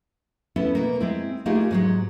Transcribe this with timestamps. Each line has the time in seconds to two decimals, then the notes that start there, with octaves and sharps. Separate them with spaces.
0.56 B3 C#4 E4 A4
0.75 B2 A#3
1.00 G#3 C4 E4
1.46 A3 A#3 D#4 F4 G4 G#4
1.71 G#2 F#3 G#3